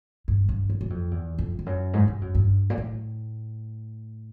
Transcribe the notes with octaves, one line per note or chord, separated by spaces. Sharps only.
G2
G2
F#2
F#2
F2
E2
F2
F2
F#2
G#2
G2
F#2
G2
A#2
A2